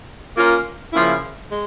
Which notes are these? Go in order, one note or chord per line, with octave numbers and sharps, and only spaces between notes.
A#3 C#4 F4 A#4
C#3 F3 A#3 C#4 E4
G#3